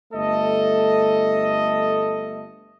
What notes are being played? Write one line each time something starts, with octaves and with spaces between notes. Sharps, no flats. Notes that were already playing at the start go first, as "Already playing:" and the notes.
G1 A3 A4 D#5